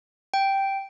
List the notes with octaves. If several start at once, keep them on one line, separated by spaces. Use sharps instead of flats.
G5